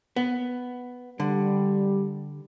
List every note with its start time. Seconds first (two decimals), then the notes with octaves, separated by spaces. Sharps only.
0.16 B3
1.20 D3 G3